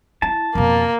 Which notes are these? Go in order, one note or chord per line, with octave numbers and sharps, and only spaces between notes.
E4 A5
F2 B2 A#3